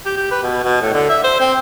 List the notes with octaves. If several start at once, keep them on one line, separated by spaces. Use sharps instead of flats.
G4
G4
B4
B2
B2
A2
D3
E5
C5
C4